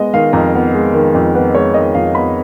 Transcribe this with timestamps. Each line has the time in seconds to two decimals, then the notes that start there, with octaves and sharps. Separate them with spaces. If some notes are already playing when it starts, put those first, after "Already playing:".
Already playing: G#3 B3 D#5
0.13 D#3 F5
0.33 F2 A#4
0.54 B3
0.73 G#3
0.93 D#3
1.15 F2
1.34 B3 B4
1.54 G#3 C#5
1.74 D#3 D#5
1.95 F2 F5
2.15 B3 B5